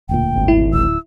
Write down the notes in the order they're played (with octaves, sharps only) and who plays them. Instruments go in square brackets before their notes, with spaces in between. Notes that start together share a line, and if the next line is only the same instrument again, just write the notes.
[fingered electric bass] E1 D2 A#2 [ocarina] G5
[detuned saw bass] G#1
[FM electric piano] E4
[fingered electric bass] D1 [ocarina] E6